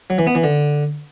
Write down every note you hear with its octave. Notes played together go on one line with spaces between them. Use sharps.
F#3
E3
B3
E3
D3